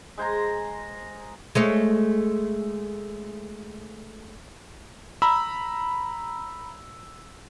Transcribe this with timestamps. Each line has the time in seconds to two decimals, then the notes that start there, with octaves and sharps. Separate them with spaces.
0.18 G#3 C5 G#5 A#5
1.55 G#3 A3 C#5
5.22 A#5 B5 E6